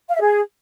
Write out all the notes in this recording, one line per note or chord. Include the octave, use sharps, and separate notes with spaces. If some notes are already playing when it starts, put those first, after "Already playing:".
F5
E5
G#4